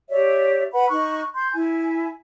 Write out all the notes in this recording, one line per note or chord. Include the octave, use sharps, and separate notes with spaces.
G4 C#5 D5 E5
B4 F#5 B5
D#4 C#6 F#6
C6 G6
E4 G#5